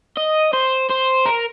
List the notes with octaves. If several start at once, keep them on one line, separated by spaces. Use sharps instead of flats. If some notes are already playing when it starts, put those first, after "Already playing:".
D#5
C5
C5
A#4